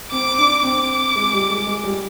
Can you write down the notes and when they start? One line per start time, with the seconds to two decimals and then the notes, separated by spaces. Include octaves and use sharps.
0.12 C4 D6
0.38 D4
0.63 C4 D6
1.16 G#3
1.33 G3
1.50 G#3
1.67 G#3
1.84 G3